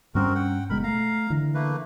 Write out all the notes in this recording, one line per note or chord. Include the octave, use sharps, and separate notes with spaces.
G2 G3 C4 C#4 F#4 A#4
F#5 G5
F#1 B2 G#3 A#4 B5
A3 F5 A#5
D3 E3
A3 A#3 B4